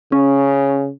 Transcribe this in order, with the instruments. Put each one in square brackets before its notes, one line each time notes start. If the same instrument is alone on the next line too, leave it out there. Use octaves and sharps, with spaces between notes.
[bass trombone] C#3 [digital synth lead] C#4